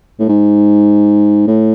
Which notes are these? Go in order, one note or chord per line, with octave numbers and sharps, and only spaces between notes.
A2
G#2
A2